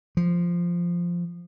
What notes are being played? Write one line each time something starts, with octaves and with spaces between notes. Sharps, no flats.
F3